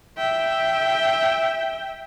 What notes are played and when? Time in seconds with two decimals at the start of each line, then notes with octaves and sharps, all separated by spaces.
0.17 E5 G5